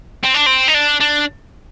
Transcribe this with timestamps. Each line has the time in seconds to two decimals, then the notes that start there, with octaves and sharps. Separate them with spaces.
0.23 C4
0.34 D4
0.46 C4
0.68 D#4
0.74 D4
1.01 D4